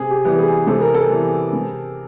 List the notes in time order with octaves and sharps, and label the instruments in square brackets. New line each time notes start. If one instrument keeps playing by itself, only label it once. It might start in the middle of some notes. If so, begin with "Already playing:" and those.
Already playing: [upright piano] C3 [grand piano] G#4
[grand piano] G4
[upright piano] E3 G3 B3
[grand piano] G#4
[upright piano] C3 [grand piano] A4
[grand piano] A#4
A4
[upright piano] E3 G3 B3
C3